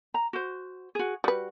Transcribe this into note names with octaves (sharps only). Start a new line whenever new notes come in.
A#5
F#4 C5
F#4 G#4
G3 F#4 B4